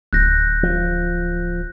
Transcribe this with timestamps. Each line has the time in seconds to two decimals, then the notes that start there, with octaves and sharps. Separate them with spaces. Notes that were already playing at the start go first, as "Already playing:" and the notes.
0.13 D1 F#6 G6 A#6
0.63 F3